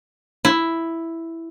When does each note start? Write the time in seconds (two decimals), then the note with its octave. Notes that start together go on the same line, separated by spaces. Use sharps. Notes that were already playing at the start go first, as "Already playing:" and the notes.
0.45 E4